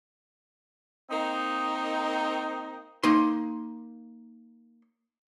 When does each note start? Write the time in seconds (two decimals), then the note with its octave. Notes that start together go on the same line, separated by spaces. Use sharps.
1.11 A#3 C4 D#4
3.03 A#3 D#4 C6